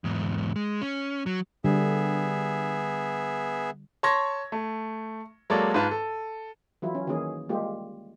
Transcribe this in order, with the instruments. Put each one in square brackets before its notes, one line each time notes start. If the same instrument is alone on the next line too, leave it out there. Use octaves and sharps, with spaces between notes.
[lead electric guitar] E2 G#2
G#3
C#4
F#3
[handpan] D3 G3 [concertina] B3 G#4 E5
[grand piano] C#5 A5 C6 C#6 G#6 A#6
A3
F#3 G#3 A#3 A4 C#5 D5
G#2 F4 B4 A5
A4
[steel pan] E3 F#3 E4 F4
C#4
D#3 E3 A#3 C#4 G#4
G3 G#3 A#3 F4 G4